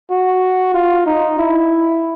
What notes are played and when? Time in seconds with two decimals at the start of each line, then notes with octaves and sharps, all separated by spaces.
0.10 F#4
0.74 F4
1.06 D#4
1.38 E4